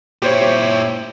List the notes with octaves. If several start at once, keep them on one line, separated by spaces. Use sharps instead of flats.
A#2 E4 G4 C5 C#5